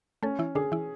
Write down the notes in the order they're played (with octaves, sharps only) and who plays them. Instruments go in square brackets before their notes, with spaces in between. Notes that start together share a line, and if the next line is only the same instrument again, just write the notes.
[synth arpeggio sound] A3 A4 [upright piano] C#4
[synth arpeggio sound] E3 E4
[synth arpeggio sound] D3 D4 [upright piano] G#4
[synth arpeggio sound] E3 E4